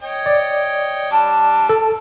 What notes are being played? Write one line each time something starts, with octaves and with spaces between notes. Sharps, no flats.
C#5 D#5 G5
D5
G3 D4 A5 D6
A4